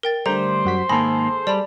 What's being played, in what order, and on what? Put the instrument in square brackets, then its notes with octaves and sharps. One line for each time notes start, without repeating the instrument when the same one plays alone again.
[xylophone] A#4 G5 A6
[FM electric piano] D3 A3 [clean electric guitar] G3 [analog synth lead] C5 [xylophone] A#5
[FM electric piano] F#2 F#4 B6
[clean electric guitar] G#2 D#3 A#3 [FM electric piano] G#4 A4 [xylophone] B5 A#6
[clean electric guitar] G3 [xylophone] D5 A5 B5